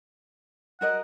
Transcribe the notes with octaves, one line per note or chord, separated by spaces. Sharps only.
F#4 A#4 D#5 F#5